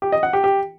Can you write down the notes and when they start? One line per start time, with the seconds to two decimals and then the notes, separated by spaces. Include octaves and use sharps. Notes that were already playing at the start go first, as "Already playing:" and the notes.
0.02 G4
0.12 D#5
0.23 F#5
0.33 G4
0.44 G4